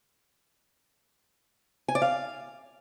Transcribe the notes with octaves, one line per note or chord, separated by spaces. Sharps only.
G#5
D5
F5